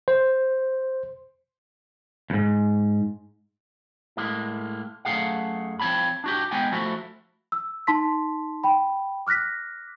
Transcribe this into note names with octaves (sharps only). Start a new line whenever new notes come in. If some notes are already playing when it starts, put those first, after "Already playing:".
C5
D#2 G#2
A2 G#3 A#3
F#2 E3 A3 G#4 F5 F#5
F3 C4 C#5 A5 B5
D4 F#4 G4
G#3 B3 D#4 G5 G#5
F3 A3 E4 F#4
E6
D#4 A5 C6 B6
G5 B5
D6 F6 F#6 A#6 B6